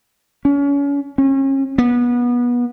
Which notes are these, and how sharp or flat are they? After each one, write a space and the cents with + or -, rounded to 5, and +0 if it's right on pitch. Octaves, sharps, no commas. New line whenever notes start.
C#4 +35
C#4 -35
B3 -25